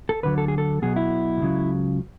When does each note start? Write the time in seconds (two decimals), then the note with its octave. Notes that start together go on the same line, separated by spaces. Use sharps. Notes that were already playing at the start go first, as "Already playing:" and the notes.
0.09 A4
0.23 D2 D3 F#3 B4
0.38 A4
0.48 G#4
0.58 A4
0.82 B1 B2 F#3 G#4
0.96 E4
1.40 C#2 C#3 F#3